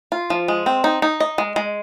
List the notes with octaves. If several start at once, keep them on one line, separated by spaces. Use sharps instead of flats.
F4
F3
G#3
C4
D#4
D#4
D#5
G#3
G#3